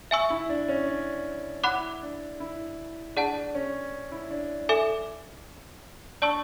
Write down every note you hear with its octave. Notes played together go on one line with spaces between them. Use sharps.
E5 G#5 C#6 E6
E4
D4
C#4
D4
E4 F#5 B5 D6 F#6
D4
E4
D4 G#4 D5 F#5 A5
C#4
E4
D4
A4 E5 G#5 D6
D4 D5 A5 C#6 E6